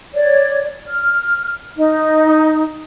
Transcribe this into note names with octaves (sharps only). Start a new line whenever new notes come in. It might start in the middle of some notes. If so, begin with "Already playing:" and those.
C#5 D5
F6
D#4